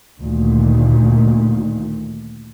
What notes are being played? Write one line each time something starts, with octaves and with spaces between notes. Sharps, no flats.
D2 A#2 D#3